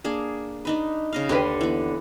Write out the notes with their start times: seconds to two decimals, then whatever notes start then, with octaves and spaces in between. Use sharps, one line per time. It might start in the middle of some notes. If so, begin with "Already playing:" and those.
0.04 A#3 D4 G#4
0.65 D4 D#4 B4
1.13 C#3 D#5 F5
1.29 D#2 D3 D4 G4 B4 C6
1.61 E3 B3